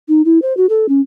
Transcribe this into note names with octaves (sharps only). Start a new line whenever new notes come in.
D#4
E4
C5
F#4
A4
C#4